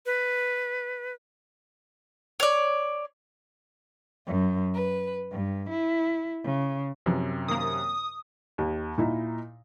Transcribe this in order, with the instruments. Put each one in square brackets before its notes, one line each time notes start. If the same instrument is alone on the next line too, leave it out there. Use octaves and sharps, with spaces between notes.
[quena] B4
[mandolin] C#5 D5
[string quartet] F#2
B4
G2
E4
C#3
[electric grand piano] F#2 C3 [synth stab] E3 F3
[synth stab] D#3 A#3 [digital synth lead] D#6
[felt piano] D#2
A#2 D#4 E4